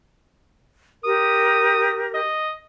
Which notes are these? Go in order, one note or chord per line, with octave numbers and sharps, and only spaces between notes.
G4 A#4 D#6
D#5